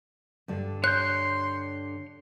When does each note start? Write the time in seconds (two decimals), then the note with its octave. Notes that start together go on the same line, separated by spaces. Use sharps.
0.48 G2 D3
0.84 C#5 C6 F#6 G6